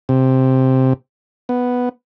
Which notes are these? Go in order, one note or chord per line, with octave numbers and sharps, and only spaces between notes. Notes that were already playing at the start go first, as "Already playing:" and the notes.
C3
B3